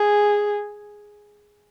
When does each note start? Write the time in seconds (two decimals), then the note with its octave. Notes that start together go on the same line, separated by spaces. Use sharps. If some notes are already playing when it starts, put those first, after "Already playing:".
Already playing: G#4